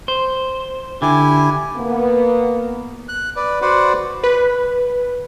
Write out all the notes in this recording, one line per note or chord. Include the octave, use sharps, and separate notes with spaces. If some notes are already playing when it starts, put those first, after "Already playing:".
C5
D3 E4 G4 G#5
A#3 B3
F#6
B4 D5
F#4 B4 C5 D5 F#5
B4